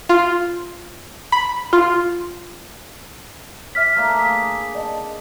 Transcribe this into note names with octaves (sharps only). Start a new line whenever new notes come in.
F4
B5
F4
D5 E5 F6 B6
A3 A#3 D4
G#4 B6
D5 D#5 A5